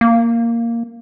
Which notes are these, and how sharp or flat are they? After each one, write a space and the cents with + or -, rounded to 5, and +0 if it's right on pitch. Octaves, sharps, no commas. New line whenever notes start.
A#3 -5